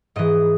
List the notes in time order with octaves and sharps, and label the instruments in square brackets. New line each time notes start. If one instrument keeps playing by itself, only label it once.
[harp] G#2 E3 D#5